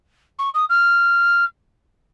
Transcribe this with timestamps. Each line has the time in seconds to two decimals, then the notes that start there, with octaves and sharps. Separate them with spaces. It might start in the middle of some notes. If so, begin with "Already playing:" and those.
0.39 C#6
0.54 D#6
0.69 F6